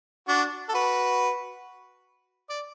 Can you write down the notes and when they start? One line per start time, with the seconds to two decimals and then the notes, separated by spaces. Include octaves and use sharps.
0.28 D4 F#4
0.69 A4
0.74 F#4 B4
2.49 D5